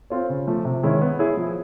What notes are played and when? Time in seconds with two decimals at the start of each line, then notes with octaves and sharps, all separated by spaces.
0.10 C4 F4 A4 C#5
0.29 C#3
0.47 F3 A3
0.65 C3
0.83 D#3 G#3 C#4 E4
1.01 B3
1.19 E4 G#4 C#5
1.37 F3